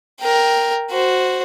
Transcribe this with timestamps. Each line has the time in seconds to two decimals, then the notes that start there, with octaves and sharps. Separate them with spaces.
0.21 A#4 G5
0.91 F#4 C5